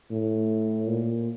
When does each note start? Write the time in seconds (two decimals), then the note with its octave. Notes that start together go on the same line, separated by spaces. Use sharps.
0.11 A2
0.88 A#2